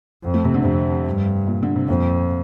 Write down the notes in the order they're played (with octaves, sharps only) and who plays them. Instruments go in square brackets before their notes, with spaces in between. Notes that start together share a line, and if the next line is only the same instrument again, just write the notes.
[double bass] F2
[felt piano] A3
C3
D3
[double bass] F2 [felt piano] C3
[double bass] G2
[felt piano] A#2
D3
C3
[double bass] F2 [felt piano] A#2